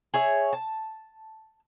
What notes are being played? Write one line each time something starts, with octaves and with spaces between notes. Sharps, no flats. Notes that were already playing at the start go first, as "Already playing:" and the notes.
G#4 C#5 E5
A5